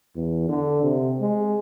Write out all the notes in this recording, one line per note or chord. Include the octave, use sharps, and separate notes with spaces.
E2
D3
C3
G#3